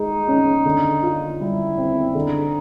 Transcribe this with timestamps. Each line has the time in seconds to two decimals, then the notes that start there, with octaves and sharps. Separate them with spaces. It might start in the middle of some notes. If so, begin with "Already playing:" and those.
Already playing: G#3 D#4
0.28 C#4
0.65 D3
1.03 F4
1.40 G3 E4
1.78 C4
2.15 D3 D#4